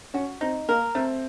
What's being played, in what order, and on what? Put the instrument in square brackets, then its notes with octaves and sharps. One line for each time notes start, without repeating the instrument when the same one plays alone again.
[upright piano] C#4 [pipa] F#4
[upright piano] C4 [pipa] D#4
[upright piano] A#3 [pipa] A#4
[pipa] A3 [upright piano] C4